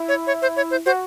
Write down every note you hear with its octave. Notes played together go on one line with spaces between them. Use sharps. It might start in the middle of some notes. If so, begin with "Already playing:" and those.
Already playing: E4
C#5
C#5
C5
C#5
C5
F#4 C5